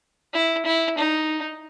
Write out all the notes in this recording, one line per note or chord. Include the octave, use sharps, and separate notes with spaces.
E4
E4
D#4